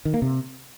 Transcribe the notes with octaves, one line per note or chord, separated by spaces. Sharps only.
D#3
A#3
C3